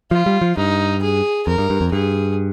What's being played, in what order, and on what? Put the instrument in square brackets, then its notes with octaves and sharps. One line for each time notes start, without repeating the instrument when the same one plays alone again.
[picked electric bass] F3 [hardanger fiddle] F4
[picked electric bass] G3
F3
[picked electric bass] G2 [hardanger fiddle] D#4
[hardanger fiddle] G#4
[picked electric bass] F2 [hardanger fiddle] A#4
[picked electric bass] G2
G2
F2
[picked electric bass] G2 [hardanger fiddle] G#4